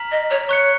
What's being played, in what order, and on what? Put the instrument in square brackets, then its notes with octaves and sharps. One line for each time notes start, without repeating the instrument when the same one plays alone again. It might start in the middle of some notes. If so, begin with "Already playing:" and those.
Already playing: [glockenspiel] A#5 F6 B6 F#7
[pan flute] D#5
C#5
[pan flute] C#5 [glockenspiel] C#6 F#6 C#7